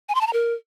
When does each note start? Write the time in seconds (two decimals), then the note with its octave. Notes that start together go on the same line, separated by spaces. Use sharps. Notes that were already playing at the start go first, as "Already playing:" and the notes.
0.09 G#5
0.15 C6
0.21 A5
0.27 A#5
0.33 A#4